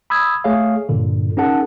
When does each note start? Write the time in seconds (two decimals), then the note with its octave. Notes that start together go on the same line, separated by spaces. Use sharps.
0.10 B5 D#6 E6 G#6
0.44 A3 G#4 C#5 F5
0.89 G2 A#2 D3
1.37 C#4 D#4 G#4 A#4 F#5 A5